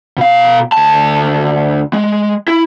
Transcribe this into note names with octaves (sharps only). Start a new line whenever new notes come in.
B2 F5
D2 A5
G#3
E4